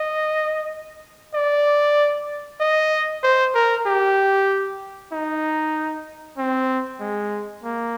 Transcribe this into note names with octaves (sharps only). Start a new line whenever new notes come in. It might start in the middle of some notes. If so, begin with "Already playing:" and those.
Already playing: D#5
D5
D#5
C5
A#4
G4
D#4
C4
G#3
A#3